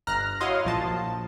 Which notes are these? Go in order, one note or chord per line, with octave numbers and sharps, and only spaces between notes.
G1 A#5 F6 F#6 A#6
E4 F#4 C#5 D#5 F5 C6
A#1 F3 A5